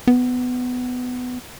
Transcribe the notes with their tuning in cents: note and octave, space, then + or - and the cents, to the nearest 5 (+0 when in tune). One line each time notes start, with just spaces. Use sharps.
B3 +15